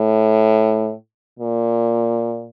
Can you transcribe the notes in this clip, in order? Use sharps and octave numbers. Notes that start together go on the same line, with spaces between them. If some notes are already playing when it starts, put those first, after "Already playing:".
Already playing: A2
A#2